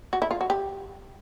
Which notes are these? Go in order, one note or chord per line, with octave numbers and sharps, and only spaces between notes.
F#4
E4
F4
F#4
G4